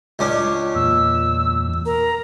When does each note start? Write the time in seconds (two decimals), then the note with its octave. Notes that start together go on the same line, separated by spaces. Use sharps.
0.19 C#2 C#4 D4
0.75 E2 A#2 E6
1.86 A#4 A#5